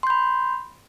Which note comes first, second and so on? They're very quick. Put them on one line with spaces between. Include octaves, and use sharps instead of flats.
C6 G6 B5